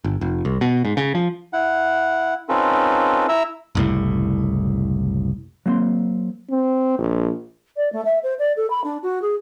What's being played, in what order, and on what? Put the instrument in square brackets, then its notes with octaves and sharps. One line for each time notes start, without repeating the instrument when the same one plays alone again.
[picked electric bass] G1
F1
C2
B2
G#2
C#3
F3
[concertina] E4 F#5
C4 C#4 D#4 F4 A4 B4
E4 E5 A#5 E6
[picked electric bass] F#1 C2 A2
[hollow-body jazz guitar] F#3 A#3 C4 C6
[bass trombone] C4
A#1
[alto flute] D5
A3
E5
C5
D5
A4
B5
D4
F#4
G#4